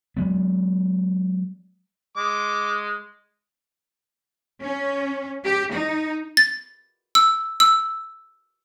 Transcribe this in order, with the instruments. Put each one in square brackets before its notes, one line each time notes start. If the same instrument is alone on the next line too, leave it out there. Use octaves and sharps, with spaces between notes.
[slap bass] F#3 G#3 B3
[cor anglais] G#3 [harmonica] D6
[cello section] C#4
G4
D#4
[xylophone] A6
E6
E6